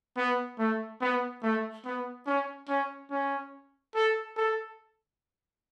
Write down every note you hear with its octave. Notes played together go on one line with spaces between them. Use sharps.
B3
A3
B3
A3
B3
C#4
C#4
C#4
A4
A4